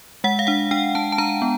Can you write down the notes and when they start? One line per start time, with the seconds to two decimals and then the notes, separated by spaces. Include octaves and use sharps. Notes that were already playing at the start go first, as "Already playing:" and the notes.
0.24 G#3 F#5
0.39 F5
0.47 D4 F#5
0.71 D4 G5
0.95 D4 A5
1.12 A5
1.18 D4 A#5
1.42 B3